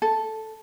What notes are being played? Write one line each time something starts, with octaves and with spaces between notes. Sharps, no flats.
A4